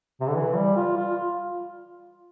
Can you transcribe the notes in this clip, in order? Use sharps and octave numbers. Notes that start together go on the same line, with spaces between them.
C3
D3
E3
G3
F4
F4